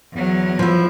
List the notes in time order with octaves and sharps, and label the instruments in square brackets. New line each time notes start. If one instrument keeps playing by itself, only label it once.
[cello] E2 F#3
[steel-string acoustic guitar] F3 E4